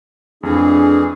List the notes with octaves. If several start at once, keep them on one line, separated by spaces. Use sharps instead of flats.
F2 E3 A3 D4 G#4